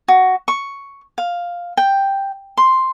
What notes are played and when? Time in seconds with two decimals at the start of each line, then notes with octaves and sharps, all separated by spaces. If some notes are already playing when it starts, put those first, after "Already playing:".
0.08 F#4
0.48 C#6
1.18 F5
1.77 G5
2.57 C6